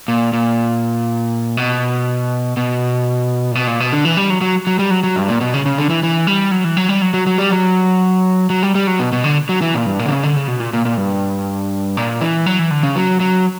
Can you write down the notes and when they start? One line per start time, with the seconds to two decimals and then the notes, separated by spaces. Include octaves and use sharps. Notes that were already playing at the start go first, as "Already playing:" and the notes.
0.08 A#2
0.33 A#2
1.57 B2
2.57 B2
3.51 A#2
3.55 B2
3.67 A#2
3.80 B2
3.93 D3
4.05 E3
4.17 G3
4.30 F#3
4.41 F#3
4.67 F#3
4.79 G3
4.91 F#3
5.03 F#3
5.16 G2
5.28 A#2
5.41 B2
5.54 C#3
5.66 C#3
5.78 D3
5.90 E3
6.03 E3
6.27 G3
6.51 F#3
6.64 E3
6.77 F#3
6.89 G3
7.02 F#3
7.14 F#3
7.27 F#3
7.38 G3
7.50 F#3
8.50 F#3
8.63 G3
8.75 G3
8.87 F#3
8.99 B2
9.13 B2
9.24 D3
9.49 F#3
9.62 E3
9.74 A#2
9.86 G2
9.99 A#2
10.06 D3
10.11 C#3
10.23 D3
10.36 C#3
10.48 B2
10.60 A#2
10.73 A#2
10.85 A#2
10.97 G2
11.97 A#2
12.21 E3
12.46 F#3
12.59 E3
12.71 D3
12.83 C#3
12.96 F#3
13.20 F#3